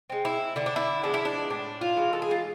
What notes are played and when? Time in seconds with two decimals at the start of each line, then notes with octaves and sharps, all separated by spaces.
0.10 G#3 C4
0.25 E4
0.56 D3 E4
0.66 D4
0.76 E4
1.03 F3 G#3 B3 D4
1.14 E4
1.25 D4
1.50 A2 D4
1.81 F4
1.97 E3 G#3
2.13 A4
2.22 G#4
2.31 F4